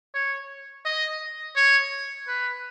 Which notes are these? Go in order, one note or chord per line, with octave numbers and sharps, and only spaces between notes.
C#5
D#5
C#5
B4